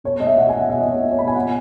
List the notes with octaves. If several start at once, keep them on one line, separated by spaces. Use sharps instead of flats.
B2 C#5
B2 D#5
E5
B2 F#5
G#5
B2
F#5
B2 E5
D#5
B2
C#5
B2
C#5
B2 B5
G#5
B2 F#5